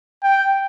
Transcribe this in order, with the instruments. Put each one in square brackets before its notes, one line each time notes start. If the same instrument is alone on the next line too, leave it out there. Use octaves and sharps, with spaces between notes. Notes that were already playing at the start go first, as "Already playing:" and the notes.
[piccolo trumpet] G5